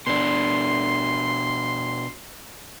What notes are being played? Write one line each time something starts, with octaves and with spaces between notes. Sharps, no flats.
B2 D4 C6